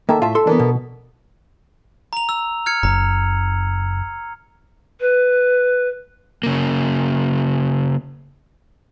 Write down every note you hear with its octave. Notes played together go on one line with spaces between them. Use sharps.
D#3 A#3 A4 E5
A2 F4 E5 A5
A4 C6
E3 B3 D4 A4 A#4
B2
A#5 F7
E6
F6 G#6 C#7
F#1 A#5
B4
C#3 A#3